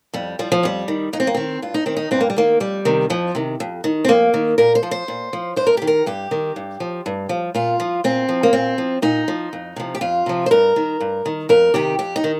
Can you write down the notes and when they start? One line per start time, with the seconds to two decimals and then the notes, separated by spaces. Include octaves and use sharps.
0.14 F2 G3
0.39 F3 G3
0.52 F3
0.63 F2 G3
0.88 D#3
1.13 F2 D#4
1.20 C4
1.27 A#3
1.34 D#3 C4
1.62 G2 F4
1.74 D#4
1.86 D#3 C4
1.97 D#4
2.11 G2 C4
2.21 A#3
2.30 G3
2.37 D#3 A#3
2.60 F2 G3
2.85 C3 D#3
3.10 F2 F3
3.35 C3 D#3
3.60 F2
3.84 D#3
4.05 C4
4.08 F2 A#3
4.34 D#3
4.58 A#2 A#4
4.75 C5
4.83 F3
4.91 C5
5.08 A#2
5.33 F3
5.56 G2 C5
5.67 A#4
5.77 D#3 G4
5.87 A#4
6.06 G2 G4
6.31 D#3
6.56 G2
6.80 F3
7.06 G2
7.29 F3
7.55 A#2 F4
7.80 F3
8.04 A#2 C4
8.29 F3
8.43 A#3
8.53 A#2 C4
8.78 F3
9.02 A#2 D#4
9.28 F3
9.53 F2
9.76 C3 F3
9.95 G4
10.01 F2 F4
10.26 C3 F3
10.46 C5
10.51 G2 A#4
10.76 D#3
11.00 G2
11.26 D#3
11.49 F2 A#4
11.74 C3 D#3 G4
11.99 F2 G4
12.16 D#4
12.24 D#3